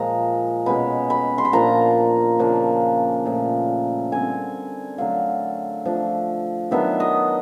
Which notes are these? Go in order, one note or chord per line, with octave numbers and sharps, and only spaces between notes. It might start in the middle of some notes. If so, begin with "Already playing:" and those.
Already playing: A#2 F3 G#3 A#5
B2 G#3 C#4 B5
B5
C6
B5
A#2 F3 A#3 D4 A#5
C#3 F3 A#3 D4
A#2 F3 A3
D3 G3 C4 G#5
D3 F#3 A3 F5
F3 A3 D4
D#3 F#3 B3 D4 E5
D#5